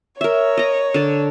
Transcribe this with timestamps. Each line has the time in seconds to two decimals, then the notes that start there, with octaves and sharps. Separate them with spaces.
0.21 A#4 C#5 E5
0.57 D#5 A#5
0.94 D3 D5